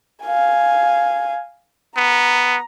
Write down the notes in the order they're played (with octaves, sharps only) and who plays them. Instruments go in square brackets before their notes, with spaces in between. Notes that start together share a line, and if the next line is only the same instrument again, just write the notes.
[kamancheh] F5 G#5
[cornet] B3 [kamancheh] A#5